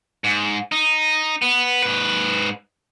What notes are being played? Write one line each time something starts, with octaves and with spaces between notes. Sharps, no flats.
G#2
D#4
B3
G#2 B4